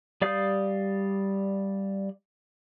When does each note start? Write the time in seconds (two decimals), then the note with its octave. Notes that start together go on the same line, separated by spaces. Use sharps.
0.22 G3 D5 F5 D#6 G6